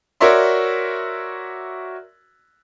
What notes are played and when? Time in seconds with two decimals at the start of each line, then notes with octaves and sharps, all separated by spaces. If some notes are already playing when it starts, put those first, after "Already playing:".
0.20 F#4 A#4 C#5 D5 E5 C6